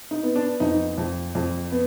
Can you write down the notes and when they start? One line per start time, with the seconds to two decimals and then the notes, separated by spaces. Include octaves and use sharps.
0.11 D#4
0.23 B3
0.36 D4
0.60 F2 D#4
0.98 F2
1.35 F2
1.72 B3